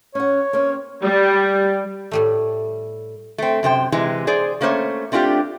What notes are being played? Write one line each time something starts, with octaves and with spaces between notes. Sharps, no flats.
C#4 C#5 F#5
A#3 C4 C#4
G3
A2 G3 A3
A3 C4
F#2 C3 C5 G5
C3 E3 G#3
G#4 C5 D5
A3 A#3 C#4 C5 C#5
A3 C4 D4 F4 G4